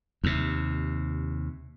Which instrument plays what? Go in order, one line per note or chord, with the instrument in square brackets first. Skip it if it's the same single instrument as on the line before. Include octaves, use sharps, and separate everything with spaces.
[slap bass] D#2 C3